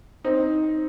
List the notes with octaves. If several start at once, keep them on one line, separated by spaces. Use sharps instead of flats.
C4 D#4